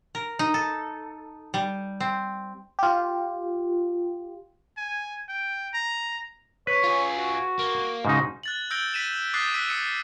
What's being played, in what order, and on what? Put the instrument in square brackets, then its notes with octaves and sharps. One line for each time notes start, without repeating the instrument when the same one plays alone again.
[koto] A#4
D#4
A4
G3
C4
[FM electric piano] F4 G4
[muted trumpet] G#5
G5
A#5
[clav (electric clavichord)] B4 [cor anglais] C#5
[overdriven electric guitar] F4 G#4
[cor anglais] F#4
F#4
[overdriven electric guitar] A#3
[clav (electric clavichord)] G#2 C#3 D#4 [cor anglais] F#4
[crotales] F#6 A6 F#7
E6 G6 A#6 D7 F#7 G7
B6 D#7 E7 F#7
D6 D#6 F#6 G6 A6 C7
E6 F#6 B6 D#7
D#6 C#7 D#7